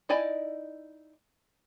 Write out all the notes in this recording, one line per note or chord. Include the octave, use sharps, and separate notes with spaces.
D#4 E4 D5 D#5 G#5